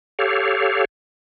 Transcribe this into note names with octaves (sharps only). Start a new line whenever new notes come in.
G4 A4 C#5 F5